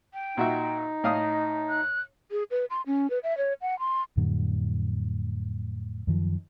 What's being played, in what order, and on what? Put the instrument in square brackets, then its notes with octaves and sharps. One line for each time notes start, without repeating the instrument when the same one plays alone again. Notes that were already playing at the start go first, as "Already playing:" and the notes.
[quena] G5
[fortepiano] A#2 F#4 E5 [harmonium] D#4
[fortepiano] A2 F5 D#6 [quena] D#5
[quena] F#6
[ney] G#4
B4
C6
C#4
B4
E5
C#5
F#5
C6
[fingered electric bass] F2 A2 D3 F#3
F#2 D#3 F3